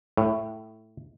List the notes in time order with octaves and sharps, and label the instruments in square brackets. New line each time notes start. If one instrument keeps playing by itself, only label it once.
[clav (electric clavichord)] A2